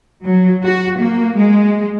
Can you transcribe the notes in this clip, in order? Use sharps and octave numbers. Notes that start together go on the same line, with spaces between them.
F#3
F#4
A#3
G#3